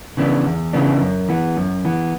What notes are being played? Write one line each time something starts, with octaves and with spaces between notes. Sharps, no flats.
C#3 E3 B3 D4
E2
C#3 E3 B3 D4
F#2
E3 B3
F#2
E3 B3